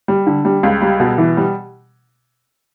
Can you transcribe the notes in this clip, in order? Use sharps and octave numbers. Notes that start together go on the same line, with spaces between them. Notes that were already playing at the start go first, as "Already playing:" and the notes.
G3
D3
G3
C#2
G3
B2
E3
G3